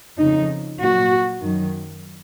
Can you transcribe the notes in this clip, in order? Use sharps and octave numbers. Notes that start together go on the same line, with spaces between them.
F2 C#3 F3 D#4
A#2 F#3 F#4
F#2 D#3 F#3